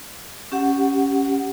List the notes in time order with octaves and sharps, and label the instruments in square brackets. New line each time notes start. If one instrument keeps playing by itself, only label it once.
[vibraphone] C#4 G4 F#5